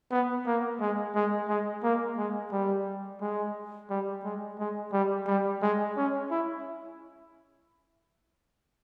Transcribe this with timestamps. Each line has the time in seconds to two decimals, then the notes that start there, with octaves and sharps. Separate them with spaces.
0.12 B3
0.46 A#3
0.80 G#3
1.15 G#3
1.48 G#3
1.83 A#3
2.17 G#3
2.52 G3
3.21 G#3
3.90 G3
4.24 G#3
4.59 G#3
4.92 G3
5.27 G3
5.62 G#3
5.97 C#4
6.31 E4